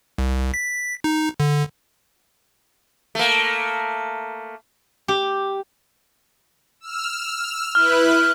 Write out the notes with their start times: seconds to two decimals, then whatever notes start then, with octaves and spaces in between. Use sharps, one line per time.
0.18 C2
0.54 B6
1.04 D#4
1.40 D3
3.15 A3 A#3
5.08 G4
6.81 E6 F6
7.75 E4 B4 F6 F#6